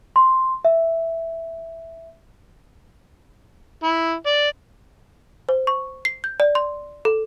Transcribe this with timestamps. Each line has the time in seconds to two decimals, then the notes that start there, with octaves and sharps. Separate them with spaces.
0.16 C6
0.65 E5
3.84 E4
4.27 D5
5.49 C5
5.67 C#6
6.05 C7
6.24 G6
6.40 D5
6.55 C6
7.05 A4